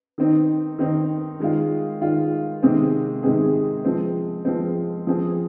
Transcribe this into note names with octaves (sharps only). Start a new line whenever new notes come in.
D#3 C4 D#4
D#3 C4 D#4
D#3 G#3 F4
D#3 G#3 F4
C3 D#3 G#3 C4 G#4
C3 D#3 G#3 C4 G#4
F3 G#3 C4
F3 G#3 C4
F3 C4 G#4